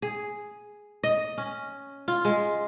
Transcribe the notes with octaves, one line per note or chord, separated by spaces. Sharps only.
G#4
D#5
C#4
F4
G#3